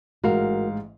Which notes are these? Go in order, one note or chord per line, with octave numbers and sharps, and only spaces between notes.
A1 G#2 F#4 A#4 F5